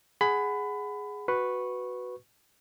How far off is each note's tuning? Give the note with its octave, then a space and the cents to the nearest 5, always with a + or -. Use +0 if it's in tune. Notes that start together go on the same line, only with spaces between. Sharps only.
G#4 +0 F#5 +0 B5 +20
F#4 +0 B4 +0 C#6 -10